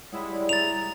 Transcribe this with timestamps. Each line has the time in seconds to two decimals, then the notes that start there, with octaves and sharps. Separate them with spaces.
0.12 G3 G#3 E4 C#5 F#5 D#6
0.33 D5
0.49 A#5 A6 F7